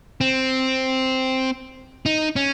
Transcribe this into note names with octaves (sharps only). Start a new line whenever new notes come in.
C4
D#4
C#4